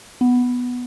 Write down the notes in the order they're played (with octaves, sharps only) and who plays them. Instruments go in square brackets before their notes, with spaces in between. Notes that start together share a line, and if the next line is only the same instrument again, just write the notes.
[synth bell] B3